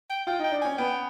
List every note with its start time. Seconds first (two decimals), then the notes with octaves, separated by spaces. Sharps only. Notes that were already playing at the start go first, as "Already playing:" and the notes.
0.09 G5
0.27 F4 G5
0.39 D#4
0.44 G5
0.52 D4
0.61 C#4 G#5
0.78 B3 G5